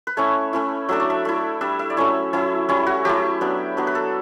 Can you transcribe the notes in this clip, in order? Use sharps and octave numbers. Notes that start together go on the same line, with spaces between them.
B4
A3 C#4 E4 C#5
A3 C#4 E4
F#3 A3 D4 E5
D5
E5
A3 E4
G3 D4 E5
E5
D5
F#3 A3 C#4 E4 C#5
F#3 C#4 E4
G3 C#4 E4 C#5
F#4
F#3 A3 E4 G4
F#3 B3 D4
F#3 B3 D4
B4
A4